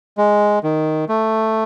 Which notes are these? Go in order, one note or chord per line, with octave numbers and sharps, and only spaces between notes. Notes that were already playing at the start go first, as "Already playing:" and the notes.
G#3
D#3
A3